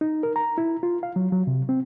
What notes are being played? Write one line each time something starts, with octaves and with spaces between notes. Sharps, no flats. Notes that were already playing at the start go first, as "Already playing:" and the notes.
D#4
A#4
A#5
E4
F4
F5
F#3
F#3
C3
C4